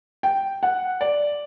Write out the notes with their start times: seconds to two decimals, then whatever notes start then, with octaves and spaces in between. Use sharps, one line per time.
0.23 G5
0.63 F#5
1.01 D5